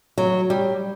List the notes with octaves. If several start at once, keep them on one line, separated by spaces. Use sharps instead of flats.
F#3
G3